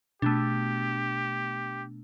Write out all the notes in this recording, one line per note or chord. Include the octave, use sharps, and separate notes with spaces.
B2 A3 B3 D4 G4